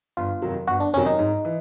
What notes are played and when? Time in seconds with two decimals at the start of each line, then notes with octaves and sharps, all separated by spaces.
0.17 G1 F4
0.42 F2 C3 D#3 F#3
0.67 G1 F#4
0.80 D4
0.94 F2 C3 D#3 F#3 C#4
1.06 D#4
1.19 G#2
1.45 E3